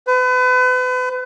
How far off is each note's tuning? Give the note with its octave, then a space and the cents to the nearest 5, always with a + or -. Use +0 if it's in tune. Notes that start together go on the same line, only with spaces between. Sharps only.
B4 +35